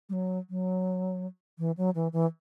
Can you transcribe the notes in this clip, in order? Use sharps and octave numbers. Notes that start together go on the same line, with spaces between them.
G3
F#3
F#3
E3
F#3
E3
E3